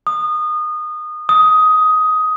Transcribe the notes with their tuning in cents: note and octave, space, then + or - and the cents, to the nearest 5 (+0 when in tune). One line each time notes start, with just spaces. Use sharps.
D#6 -25
D#6 +10